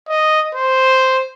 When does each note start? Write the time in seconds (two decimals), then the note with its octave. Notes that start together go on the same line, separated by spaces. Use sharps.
0.09 D#5
0.54 C5